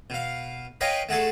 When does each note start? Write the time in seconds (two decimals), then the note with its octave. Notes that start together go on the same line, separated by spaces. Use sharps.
0.10 B2 F5
0.81 B4 C#5 D#5 F5 G5 G#5
1.09 A3 F#4 G#4 A4